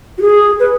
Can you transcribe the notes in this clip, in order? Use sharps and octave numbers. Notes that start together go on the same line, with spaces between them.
F#4
G#4
B4